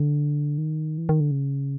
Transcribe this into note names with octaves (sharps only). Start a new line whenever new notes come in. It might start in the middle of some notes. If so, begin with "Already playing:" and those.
Already playing: D3
D#3
E3
D#3
D3
C#3